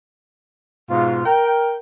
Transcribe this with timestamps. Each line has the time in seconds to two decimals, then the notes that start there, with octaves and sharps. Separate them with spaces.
0.90 G#2 B2 F4
1.26 A#4 G5